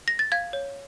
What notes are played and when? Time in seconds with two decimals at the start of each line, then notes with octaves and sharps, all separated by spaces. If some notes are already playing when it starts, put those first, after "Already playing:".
0.08 A#6
0.19 A6
0.32 F5 G#6
0.53 C#5